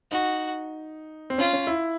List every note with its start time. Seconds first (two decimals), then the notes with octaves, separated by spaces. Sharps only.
0.11 D#4 F#4
1.30 C4
1.38 C#4 F4
1.53 C#4
1.67 E4